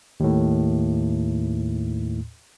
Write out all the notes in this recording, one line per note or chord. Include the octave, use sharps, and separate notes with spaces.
D#2 A2